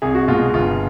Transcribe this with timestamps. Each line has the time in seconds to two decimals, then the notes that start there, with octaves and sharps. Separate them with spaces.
0.02 C2 G#4
0.15 F#4
0.28 B2 G#3 F4
0.54 G1 F4